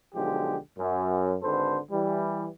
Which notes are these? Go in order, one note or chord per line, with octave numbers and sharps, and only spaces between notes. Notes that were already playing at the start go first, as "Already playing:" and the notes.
B1 D3 F3 G#3 G4
F#2
G#1 D3 A4 B4 C5
E3 G3